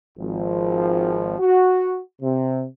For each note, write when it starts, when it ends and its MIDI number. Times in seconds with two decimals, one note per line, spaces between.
0.18 1.34 32
0.18 1.34 53
1.40 1.99 66
2.22 2.65 48